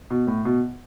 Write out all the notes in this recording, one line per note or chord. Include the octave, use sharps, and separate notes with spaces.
B2
A2
B2